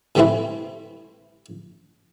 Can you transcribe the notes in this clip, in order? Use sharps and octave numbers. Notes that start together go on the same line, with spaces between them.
A2 C3 E3 A3 C4 E4